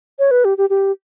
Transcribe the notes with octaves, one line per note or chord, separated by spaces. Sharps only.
C#5
B4
G4
G4
G4